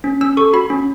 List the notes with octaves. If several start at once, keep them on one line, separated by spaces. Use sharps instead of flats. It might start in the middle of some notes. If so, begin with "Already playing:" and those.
C#4
C#4 E6
A4 C#6
F#4 B5
C#4